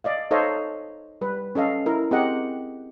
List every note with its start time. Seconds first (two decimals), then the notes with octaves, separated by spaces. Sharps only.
0.04 D5 D#5 F5
0.31 D#4 A4 C5 C#5 D#5 F5
1.21 G3 B4
1.55 C#4 A4 D#5 F5
1.86 E4 A#4
2.11 C4 G4 G#4 A#4 D#5 F#5